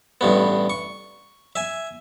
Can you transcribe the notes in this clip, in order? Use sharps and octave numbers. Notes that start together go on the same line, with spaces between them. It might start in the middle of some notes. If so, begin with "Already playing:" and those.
A1 G2 B3
C#6
E5 G#5